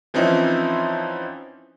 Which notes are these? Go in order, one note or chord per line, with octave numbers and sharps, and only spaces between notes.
E3 F3 C4 C#4 D#4 E4